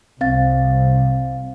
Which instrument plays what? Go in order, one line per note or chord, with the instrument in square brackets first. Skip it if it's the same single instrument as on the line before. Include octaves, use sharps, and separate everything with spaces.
[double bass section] C2 C3 [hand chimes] C4 F5 A6